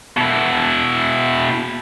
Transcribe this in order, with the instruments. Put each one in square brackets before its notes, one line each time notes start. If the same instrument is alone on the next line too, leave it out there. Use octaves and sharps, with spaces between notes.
[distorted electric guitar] B2 E4